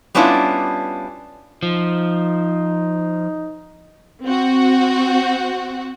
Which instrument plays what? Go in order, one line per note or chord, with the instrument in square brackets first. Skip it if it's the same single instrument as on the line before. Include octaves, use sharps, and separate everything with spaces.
[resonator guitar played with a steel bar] G3 B3 C#4 D4 E4 F4
[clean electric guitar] F3 [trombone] D#4
[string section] C4 F#4